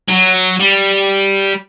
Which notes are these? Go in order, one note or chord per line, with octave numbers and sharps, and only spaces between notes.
F#3
G3